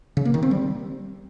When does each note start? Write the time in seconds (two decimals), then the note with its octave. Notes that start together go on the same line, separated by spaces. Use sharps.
0.17 C#3
0.25 A#3
0.34 D#3
0.43 C4
0.51 G3